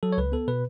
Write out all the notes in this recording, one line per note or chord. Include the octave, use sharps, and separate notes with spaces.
F#3 A4
C#5
C#2 B4
B3 A4
B2 B4